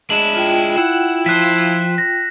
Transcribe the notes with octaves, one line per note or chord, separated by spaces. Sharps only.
G#3 D4 E4 E7 F#7
F4 G5
E4 F#5
F3 C5 F#6 B6
A#6